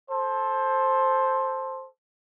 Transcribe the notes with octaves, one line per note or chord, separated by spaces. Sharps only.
A4 C5